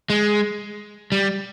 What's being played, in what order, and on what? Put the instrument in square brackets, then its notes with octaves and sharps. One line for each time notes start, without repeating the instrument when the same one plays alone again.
[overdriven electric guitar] G#3
G3